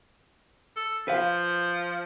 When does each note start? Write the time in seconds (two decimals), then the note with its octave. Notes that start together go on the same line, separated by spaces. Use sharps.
0.76 A4
1.08 F3 B4 F5